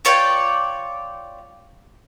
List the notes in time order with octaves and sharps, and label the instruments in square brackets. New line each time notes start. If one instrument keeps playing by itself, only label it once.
[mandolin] F4 C#5 D5 G5